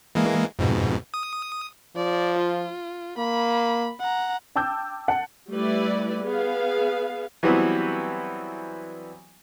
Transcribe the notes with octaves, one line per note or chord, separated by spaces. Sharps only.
E3 G#3 A#3
F2 G#2 B2
D#6
F3 D5
F4
A#3 B5
F#5 A#5
G5 A5 D6 E6 G6
F#5 A5
G3 A3 E4 B4 D5
B3 G#4 F5
E3 F#3 G3 B3 C4 E4